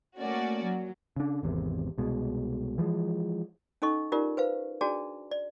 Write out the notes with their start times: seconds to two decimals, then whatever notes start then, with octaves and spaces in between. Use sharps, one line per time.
0.18 A3 A#3 C#4 F#4 D5
0.64 F#3
1.16 C#3 D4
1.43 G#1 E2 C3
1.98 C2 B2 G#3
2.78 E3 F3 G#3
3.82 C#4 D#4 A4 D#5 C#6
4.12 C#4 D#4 F4 G4 A#4 D5
4.37 B4 C5 F5
4.81 D4 F#4 G#4 D5 A5
5.31 D5